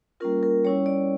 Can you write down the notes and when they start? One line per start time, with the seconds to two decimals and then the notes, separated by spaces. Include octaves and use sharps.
0.20 G3 A#3 C#4 F4 A#4
0.43 A#4
0.64 G3 C#4 E4 C#5
0.86 D5